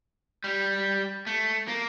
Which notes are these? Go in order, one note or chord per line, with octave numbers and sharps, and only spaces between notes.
G3
A3
A#3